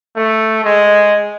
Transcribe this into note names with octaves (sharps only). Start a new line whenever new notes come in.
A3
G#3